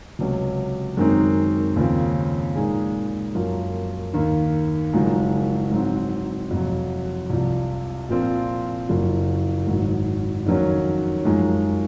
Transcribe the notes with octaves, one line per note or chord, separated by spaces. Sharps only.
C#2 C3 F#3 C#4
F#2 D#3 G#3 C4 D#4
D#2 C#3 F3 C4
A#2 G#3 D#4 G#4
F#2 F3 A#3 F4
D#2 D#3 A#3
F#1 F#2 F3 G#3 D#4
G#2 F#3 C4
F2 C3 F#3
C2 C3 F3
A#2 F3 C4 F4
F#1 F#2 F3
G#1 G#2 F#3
F2 D#3 F#3 C#4
F#2 F3 G#3 D#4